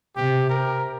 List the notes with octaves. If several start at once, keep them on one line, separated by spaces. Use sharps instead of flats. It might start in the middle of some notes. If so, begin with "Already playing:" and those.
C3 G4
A#4